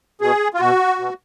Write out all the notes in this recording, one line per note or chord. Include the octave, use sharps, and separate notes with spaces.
B2 G#4
F4
B2 F#4
B2